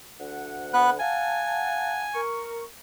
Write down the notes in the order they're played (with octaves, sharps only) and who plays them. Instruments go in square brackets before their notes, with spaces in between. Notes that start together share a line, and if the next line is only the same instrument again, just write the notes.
[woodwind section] D2 F#5
[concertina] B3 B4 F#6
[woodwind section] F5 F#5 A5 [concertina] G#5
[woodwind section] A#4 C#6